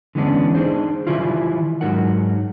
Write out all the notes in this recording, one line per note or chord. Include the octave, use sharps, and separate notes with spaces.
D3 E3 G#3 B3 C#4 D4
D4 D#4 G#4 C5
D#3 E3 G3 E4 F4
G#2 F#3 D#4 A#4 F#5